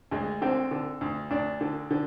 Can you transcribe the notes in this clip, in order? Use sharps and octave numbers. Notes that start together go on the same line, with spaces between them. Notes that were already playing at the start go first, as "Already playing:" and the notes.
D2 G#3
D3 C4
D3
D2
D2 D4
D3
D3